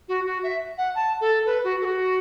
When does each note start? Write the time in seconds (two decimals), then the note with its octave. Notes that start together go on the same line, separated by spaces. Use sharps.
0.09 F#4
0.26 F#4
0.43 E5
0.78 F#5
0.95 A5
1.21 A4
1.46 B4
1.64 F#4
1.81 A4
1.85 F#4